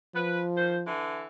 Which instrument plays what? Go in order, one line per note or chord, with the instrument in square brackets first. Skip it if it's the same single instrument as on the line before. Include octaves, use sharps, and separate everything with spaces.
[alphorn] F3 [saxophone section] B4
[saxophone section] D#3 C5
D3 E3